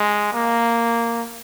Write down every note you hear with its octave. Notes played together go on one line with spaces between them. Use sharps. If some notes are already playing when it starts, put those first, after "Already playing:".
Already playing: G#3
A#3